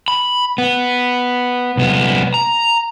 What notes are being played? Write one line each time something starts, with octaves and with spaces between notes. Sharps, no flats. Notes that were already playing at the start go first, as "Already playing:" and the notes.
B5
B3
C2 B3
A#5